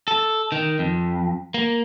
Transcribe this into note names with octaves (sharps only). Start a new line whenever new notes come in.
A4
D#3
F2
A#3